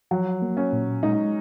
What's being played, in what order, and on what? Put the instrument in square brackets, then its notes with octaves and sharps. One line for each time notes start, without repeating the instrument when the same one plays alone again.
[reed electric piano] F3 [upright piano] F#3
[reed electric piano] A#3
[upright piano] C#4
[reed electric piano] A#2
[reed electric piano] G#3 [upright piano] D#4